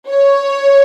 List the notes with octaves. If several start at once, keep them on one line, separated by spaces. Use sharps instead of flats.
C#5